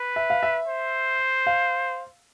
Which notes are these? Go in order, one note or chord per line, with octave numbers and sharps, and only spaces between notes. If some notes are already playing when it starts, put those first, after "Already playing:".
Already playing: B4
E5
F5
E5
C5
F5